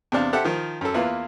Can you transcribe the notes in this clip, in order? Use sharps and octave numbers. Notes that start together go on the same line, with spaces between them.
E2 C3 C4 D4 F5
G4 A4 C5 E5 F#5
D#3 F3
F#2 A4
E2 A#3 E4 F4 B4